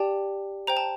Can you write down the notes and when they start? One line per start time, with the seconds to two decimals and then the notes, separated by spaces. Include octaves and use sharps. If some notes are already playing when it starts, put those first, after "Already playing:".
Already playing: G4 D5 G5 A5
0.67 C5 G5 A#5
0.77 A5